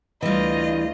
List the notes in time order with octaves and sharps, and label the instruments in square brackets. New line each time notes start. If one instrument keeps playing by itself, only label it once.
[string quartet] D2 F4 D#5 [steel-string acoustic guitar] E3 G3